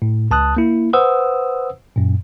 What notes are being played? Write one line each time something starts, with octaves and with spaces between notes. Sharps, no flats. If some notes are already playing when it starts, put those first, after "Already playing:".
A2
C#2 A5 D#6 F#6
A#3 E4
B4 C5 F#5 D#6 E6
F#2 A#2